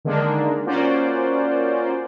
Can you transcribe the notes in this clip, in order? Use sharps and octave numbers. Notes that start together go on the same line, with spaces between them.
D3 D#3 G#3 A#3 D4
A#3 C#4 F4 F#4 C5 D5